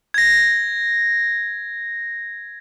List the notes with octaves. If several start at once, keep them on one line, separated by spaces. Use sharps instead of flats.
G#6 A#6